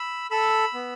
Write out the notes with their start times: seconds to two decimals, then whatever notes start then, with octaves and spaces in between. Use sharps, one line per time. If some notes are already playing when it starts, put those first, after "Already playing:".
Already playing: B5 E6
0.31 A4 B5 E6
0.74 B3